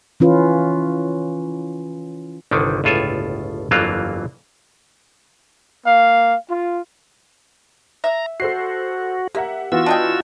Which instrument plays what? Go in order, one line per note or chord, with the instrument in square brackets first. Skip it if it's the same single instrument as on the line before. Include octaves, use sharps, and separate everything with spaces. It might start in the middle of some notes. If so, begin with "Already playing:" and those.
[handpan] E3 C#4 F4 B4
[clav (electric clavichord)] G1 C2 D3 D#3
G1 C#2 A2 F4 A4 G#5
G1 F2 E3 F#3 A#3 F4
[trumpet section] A#3 F5
F4
[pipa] E5 [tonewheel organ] A#5
[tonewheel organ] F#4 [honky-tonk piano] A4 C5 C7
[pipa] A#3 [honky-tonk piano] G4 E5 F#5
[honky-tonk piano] E3 B3 [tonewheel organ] F4 F#4 E6
[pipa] D4 D#5 G5